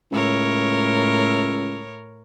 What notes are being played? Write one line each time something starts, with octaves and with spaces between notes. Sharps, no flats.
C#2 A2 A#4 C#5